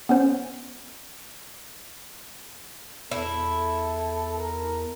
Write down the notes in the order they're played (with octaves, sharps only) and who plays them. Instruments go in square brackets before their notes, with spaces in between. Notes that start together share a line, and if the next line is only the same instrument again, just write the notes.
[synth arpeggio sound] B3 C#4 C5
[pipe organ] E2 [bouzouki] E4 [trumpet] A4
[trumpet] A#4